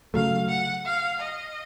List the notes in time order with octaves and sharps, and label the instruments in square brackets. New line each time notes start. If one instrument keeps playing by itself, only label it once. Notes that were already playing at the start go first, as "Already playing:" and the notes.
[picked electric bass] C#3 F#3 A3 [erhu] F5
[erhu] F#5
F5
D#5